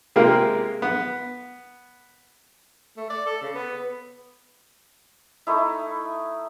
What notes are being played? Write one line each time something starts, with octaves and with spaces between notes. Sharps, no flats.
C3 G#3 A#3 F4 G4 A#4
B3
A3
D5
A4
C#3
B3
A3 D#4 E4